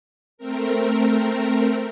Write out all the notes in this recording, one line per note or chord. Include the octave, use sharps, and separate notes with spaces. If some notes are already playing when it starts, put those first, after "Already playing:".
A3 C4 A#4